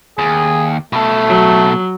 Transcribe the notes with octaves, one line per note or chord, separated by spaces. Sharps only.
D#2 G#4
B2 A3 A4
F#3